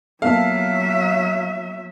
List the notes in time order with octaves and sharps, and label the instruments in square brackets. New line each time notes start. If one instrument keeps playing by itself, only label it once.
[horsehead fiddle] F#3 E5 [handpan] A#3 B3 A4 [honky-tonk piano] F5